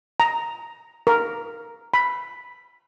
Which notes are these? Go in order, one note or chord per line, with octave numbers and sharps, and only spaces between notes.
A#5
A#4
B5